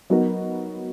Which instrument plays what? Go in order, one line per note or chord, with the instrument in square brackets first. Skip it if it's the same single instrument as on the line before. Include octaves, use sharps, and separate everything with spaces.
[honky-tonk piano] F#3 B3 D#4 F#4 A#4